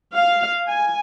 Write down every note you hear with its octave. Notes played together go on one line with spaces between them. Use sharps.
F5
G#5